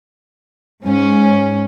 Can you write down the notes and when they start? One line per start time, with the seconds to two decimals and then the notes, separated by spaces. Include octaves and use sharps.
0.85 G#2 C#4